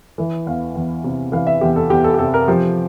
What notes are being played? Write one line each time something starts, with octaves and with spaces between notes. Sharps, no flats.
E3
E2 F5
E2
C3
E3 F5
E5
E2 G4
A4
E2 G4
A4
G4
C3 A4
A#4
F3 G4